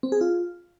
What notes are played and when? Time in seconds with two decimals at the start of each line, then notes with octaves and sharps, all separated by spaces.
0.03 C4
0.12 G#4
0.21 F4